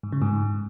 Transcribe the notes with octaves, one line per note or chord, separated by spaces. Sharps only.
G#2
C#3
G#2